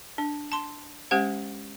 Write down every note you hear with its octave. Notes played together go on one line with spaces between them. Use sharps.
D4
A5 C6
G#3 C#4 G4 C5 F#5